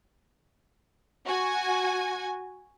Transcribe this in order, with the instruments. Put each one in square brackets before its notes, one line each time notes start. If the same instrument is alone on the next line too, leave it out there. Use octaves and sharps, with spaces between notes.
[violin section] F#4 G#5